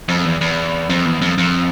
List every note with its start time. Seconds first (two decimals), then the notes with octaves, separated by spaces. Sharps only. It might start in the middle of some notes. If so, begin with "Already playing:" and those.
0.09 F2
0.25 E2
0.41 E2
0.89 F2
1.05 E2
1.21 F2
1.38 F2